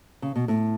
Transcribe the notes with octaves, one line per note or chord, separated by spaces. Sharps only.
C#3
B2
A2